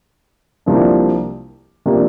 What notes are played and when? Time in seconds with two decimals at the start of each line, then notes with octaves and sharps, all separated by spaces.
0.66 C2 C3 F3 A#3 D4
1.86 C3 F3 A#3 D4